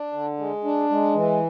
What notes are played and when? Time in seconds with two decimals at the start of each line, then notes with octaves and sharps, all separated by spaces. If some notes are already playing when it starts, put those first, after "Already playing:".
Already playing: D4
0.13 D3
0.39 G#3
0.64 D4
0.90 G#3
1.14 E3